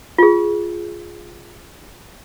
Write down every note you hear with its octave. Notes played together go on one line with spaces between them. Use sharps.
F4 G#4